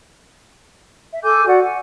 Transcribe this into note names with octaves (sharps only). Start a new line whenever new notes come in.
E5
A4 G#5 D6 G6
F#4 D5 F#5
F#5 G#5